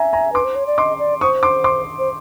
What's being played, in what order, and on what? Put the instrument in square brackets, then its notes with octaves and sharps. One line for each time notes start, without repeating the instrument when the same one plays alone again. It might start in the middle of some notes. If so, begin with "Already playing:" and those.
Already playing: [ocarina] E5 [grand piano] G#5 A#5
[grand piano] G#5 A#5
[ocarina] B4 [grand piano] C6 D6
[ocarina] C5
C#5
D5
[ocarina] D#5 [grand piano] C6 D6
[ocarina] D5
[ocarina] C5 [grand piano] C#6 D#6
[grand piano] C6 D6
C6 D6
[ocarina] C5